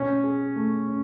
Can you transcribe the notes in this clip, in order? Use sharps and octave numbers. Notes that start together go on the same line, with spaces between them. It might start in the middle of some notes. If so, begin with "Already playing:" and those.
Already playing: B2 C#4
G#4
A3
C#4